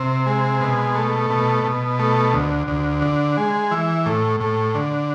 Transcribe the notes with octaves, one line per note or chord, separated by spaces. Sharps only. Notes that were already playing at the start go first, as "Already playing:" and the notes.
Already playing: C3
G#3
B2
A3
B2
B2
A3
D2
D2
D3
G#3
E3
A2
A2
D3